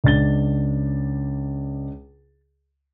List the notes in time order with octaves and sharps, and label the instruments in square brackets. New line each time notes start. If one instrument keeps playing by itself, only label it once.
[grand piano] C#2 D4 A6 G7